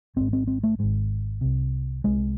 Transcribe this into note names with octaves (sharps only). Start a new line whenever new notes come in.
G#1 G#2 C4
C4
C4
A3
G#1 G#2 G#3
C2 C3
C2 C3 G#3